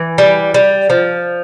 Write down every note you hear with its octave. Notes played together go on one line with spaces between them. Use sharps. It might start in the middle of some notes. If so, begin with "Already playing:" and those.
Already playing: E3
G3
G3
F3